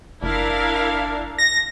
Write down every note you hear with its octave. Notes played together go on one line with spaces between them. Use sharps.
F#1 D4 E4 A#4 F5
A#6